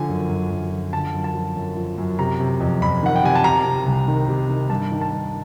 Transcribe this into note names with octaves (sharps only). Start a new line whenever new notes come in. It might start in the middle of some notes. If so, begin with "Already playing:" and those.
Already playing: D3 F3 G#5
F#2
F#2
F#2
F3
D3 A5
F#2
A5
F3
F#2
F3
F#2
C3 A#5
C3
F2
F2 B5
D#3 F#5
G5
C3 G#5
A5
C3 A#5
C3
C2
D#3
C3
D#3
G2 A5
D#3
A5
G2